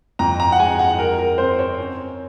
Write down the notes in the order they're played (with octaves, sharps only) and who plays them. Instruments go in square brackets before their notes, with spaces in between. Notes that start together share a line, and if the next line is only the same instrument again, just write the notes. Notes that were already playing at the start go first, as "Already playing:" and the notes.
[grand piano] F2 A#5
A#5
F#5
G#3 G#5
F#5
G#3 A#4
A#4
C4 C5
C#5
C#4